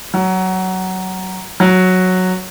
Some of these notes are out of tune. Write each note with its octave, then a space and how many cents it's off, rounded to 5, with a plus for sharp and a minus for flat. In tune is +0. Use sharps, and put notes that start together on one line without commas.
F#3 +15
F#3 -5